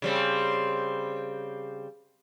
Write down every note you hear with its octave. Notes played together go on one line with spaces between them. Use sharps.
C#3 G3 C4